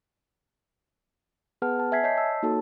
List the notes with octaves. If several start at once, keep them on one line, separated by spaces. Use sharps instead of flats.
B3 G#4 B4 F#5 A5 F6
A5
E5 G#5 G#6 B6 C7
C#5 D#5 A5 G6 B6 C7
A5 E6
A#3 D#4 F#4 A4 C#5 A5